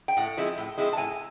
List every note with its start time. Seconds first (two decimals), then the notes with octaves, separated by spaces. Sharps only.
0.08 G5
0.17 A2 F#5
0.37 F3 G#3 C4 E4
0.58 A2
0.78 F3 G#3 C4 E4
0.93 A5
0.97 A2 G#5